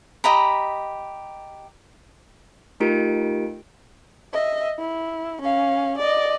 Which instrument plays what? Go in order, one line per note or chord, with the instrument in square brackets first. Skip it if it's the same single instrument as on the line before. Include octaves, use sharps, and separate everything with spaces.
[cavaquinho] G4 D#5 A#5 B5
[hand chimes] A3 D#4 F4 G4 A#4 D7
[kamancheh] D#5 E5
E4
C#4 F5
D5 D#5